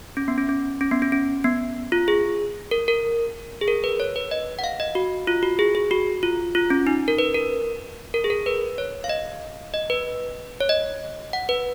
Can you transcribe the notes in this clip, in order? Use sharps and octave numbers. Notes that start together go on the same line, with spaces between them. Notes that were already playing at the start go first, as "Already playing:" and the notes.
C#4
B3
C#4
C#4
C#4
B3
C#4
C#4
B3
F4
G#4
A#4
A#4
G#4
A#4
B4
C#5
B4
D#5
F#5
F5
D#5
F#4
F4
F#4
G#4
G#4
F#4
F4
F4
C#4
D#4
A#4
B4
A#4
A#4
G#4
A#4
B4
C#5
F5
D#5
D#5
B4
C#5
D#5
F#5
B4